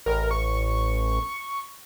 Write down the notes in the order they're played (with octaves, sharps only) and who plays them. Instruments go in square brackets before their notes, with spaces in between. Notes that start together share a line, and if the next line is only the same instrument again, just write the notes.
[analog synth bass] A1 [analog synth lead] A#4
[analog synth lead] C#6